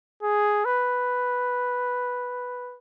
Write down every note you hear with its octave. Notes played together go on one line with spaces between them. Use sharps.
G#4
B4